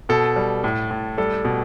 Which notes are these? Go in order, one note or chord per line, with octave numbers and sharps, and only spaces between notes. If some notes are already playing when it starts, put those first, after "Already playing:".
B2 A4
G3
A2
A2
G3 A4
B2